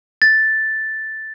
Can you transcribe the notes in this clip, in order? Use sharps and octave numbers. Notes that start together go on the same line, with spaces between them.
A6